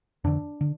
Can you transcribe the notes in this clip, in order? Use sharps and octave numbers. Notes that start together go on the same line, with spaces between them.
F2 D3 D4
D3